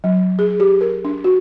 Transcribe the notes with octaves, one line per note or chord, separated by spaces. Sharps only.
F#3
G#4
G4
A#4
D4
F#4